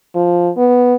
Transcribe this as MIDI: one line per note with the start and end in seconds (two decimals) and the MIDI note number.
0.15 0.50 53
0.57 0.95 59